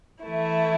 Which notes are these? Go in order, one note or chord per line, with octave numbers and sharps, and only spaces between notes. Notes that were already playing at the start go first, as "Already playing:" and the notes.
E3 A3 E4